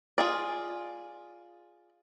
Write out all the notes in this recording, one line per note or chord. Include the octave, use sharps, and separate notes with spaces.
F4 G#4 D5